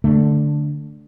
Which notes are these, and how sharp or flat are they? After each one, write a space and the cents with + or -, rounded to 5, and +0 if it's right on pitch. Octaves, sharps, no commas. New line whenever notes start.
D3 +0 A3 +0